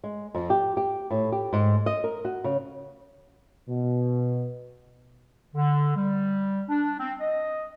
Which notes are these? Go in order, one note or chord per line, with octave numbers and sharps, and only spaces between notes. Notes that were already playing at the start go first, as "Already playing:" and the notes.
G#3
F2
G4
G4
A2
G4
G#2
D#5
A#4
F#4
C#3
B2
D3
G3
D4
C4
D#5